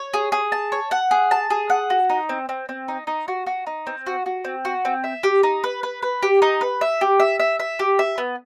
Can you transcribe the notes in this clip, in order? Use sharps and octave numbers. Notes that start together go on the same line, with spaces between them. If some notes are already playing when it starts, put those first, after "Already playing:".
Already playing: C#5
G#4
G#4
A5
C#5
F#5
G#4
A5
G#4
F#5
F#4
D#4
C4
C4
C4
D#4
D#4
F#4
F#4
D#4
C4
F#4
F#4
C4
F#4
C4
E5
G4
D#4
B4
B4
B4
G4
D#4
B4
E5
G4
E5
E5
E5
G4
E5
B3